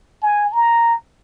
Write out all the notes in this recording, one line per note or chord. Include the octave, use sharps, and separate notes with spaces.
G#5
A#5